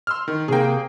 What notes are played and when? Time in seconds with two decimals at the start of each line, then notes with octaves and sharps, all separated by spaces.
0.07 C6 E6 F6
0.28 D#3
0.48 C3 A#3 G#4 G5